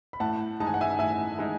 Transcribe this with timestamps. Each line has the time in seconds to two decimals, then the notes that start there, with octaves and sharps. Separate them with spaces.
0.13 B5
0.20 A2 F#5 A5
0.60 G#3 D#4 A5
0.67 G#5
0.74 F#5
0.81 E5 G#5
0.99 A2 E5 G#5
1.39 G#3 D#4